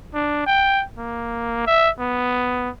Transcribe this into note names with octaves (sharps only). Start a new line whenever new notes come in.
D4
G5
A#3
E5
B3